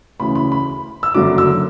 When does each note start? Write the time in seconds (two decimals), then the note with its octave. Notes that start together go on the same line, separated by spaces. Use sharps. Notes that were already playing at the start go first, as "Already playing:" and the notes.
0.20 D2 C#3 E3 B5
0.35 B5
0.52 B5
1.03 E6
1.14 F#1 F#2 D3 F#3 D6
1.38 E6